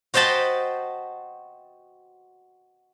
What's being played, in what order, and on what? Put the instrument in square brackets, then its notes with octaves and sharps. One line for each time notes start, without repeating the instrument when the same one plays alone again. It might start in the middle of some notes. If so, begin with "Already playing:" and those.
[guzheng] F#4 C5 D#5 G5 A5 B5